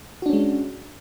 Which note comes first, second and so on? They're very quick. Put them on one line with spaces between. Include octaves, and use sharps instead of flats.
F#4 D4 C#4 G#3